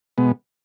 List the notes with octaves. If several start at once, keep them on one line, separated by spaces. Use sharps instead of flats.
B2 G#3 B3